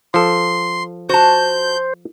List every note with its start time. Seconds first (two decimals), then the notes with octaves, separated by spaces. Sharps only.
0.14 F3 A4 C6
1.09 F#4 C5 A5 G6